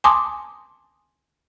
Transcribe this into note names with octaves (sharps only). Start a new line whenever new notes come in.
G#5 A5 C6 D6 D#6